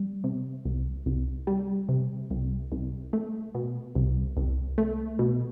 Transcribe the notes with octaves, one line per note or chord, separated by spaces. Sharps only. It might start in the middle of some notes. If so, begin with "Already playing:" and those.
Already playing: G3
C3
C2
C2
G3
C3
C2
C2
A3
B2
C2
C2
A3
B2